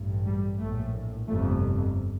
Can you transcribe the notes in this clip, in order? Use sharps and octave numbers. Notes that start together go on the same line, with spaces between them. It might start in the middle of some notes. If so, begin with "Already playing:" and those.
Already playing: A1 G2
G3
A#1 A2 A3
G1 F2 C3 A3